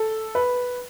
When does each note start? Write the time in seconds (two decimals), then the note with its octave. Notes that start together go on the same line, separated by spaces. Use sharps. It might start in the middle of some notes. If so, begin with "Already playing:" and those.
Already playing: A4
0.35 B4